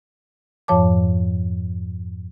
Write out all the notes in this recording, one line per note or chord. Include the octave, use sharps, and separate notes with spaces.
F2 G#2 F3 C#5 A5 D6